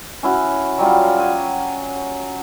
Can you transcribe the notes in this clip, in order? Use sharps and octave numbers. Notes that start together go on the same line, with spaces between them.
C#4 E4 F#4
F#3 G3 F4
F#5 G#5